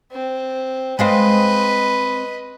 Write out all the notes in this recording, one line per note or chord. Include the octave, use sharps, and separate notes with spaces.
C4
G#3 C4 B4 D#5 F5